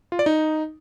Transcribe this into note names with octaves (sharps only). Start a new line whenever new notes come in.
F4
D5
D#4